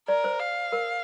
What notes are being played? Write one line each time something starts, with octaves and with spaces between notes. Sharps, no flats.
A#4 D5
C5
F5
A#4